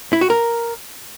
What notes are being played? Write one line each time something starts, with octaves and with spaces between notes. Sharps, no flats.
E4
F#4
A#4